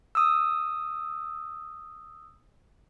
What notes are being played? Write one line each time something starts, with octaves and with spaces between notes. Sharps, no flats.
D#6 E6